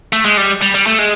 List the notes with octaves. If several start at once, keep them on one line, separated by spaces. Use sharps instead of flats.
A3
G#3
G3
G3
G3
A3
G#3